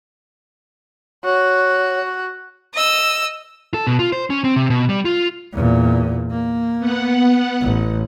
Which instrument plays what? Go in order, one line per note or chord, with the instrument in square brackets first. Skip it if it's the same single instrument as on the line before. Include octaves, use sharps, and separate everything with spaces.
[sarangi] F#4 [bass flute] C#5
[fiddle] D#5 E6
[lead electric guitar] A4
B2
F4
C5
C#4
C4
C3
B2
G3
F4
[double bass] E2 A#2
A#3
[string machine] B3 F#5
[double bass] A1